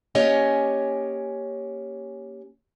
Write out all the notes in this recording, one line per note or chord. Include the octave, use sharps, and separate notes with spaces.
A#3 C#4 G4 C#5 D#5 G#5